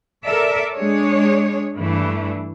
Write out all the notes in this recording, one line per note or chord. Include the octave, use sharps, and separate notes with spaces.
A4 A#4 D5 E5
G#3 D4 G#4 C#5
G2 E3 A3 D4